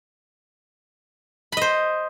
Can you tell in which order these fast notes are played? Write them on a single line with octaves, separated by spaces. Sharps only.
B5 D#5 C5